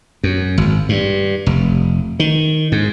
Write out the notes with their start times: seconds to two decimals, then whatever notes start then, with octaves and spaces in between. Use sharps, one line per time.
0.23 F#2
0.58 G#1
0.89 G2
1.46 F1
2.20 D#3
2.72 G#2